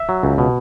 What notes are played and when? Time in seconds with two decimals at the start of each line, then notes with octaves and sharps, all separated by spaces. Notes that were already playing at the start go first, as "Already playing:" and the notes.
Already playing: E5
0.09 F#3
0.23 C#2
0.38 B2